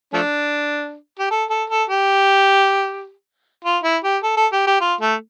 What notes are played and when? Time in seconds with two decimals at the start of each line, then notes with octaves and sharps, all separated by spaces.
0.14 F3 A3 D4
1.19 G4
1.31 A4
1.50 A4
1.70 A4
1.90 G4
3.65 F4
3.84 E4
4.04 G4
4.23 A4
4.37 A4
4.53 G4
4.67 G4
4.81 F4
5.01 A3